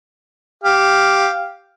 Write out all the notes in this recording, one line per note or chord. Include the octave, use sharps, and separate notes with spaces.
G4 F5